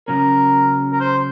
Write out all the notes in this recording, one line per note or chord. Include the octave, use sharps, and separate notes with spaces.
C#3 F#3 C#4 A#4
A#4
C5